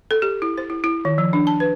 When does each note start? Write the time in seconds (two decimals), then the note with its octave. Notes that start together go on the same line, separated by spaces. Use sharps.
0.11 A4
0.22 G4
0.42 E4
0.58 C5
0.70 E4
0.84 E4
1.05 D#3
1.18 F3
1.33 D4
1.47 A5
1.60 B4